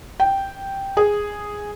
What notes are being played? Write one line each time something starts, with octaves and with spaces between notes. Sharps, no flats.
G5
G#4